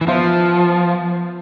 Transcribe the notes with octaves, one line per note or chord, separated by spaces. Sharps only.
E3
F3 B3 F4 C5 E5